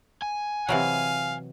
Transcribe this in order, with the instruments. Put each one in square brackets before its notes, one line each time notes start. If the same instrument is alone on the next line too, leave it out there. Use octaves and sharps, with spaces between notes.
[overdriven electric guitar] G#5
[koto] C3 E3 F#3 [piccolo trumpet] F5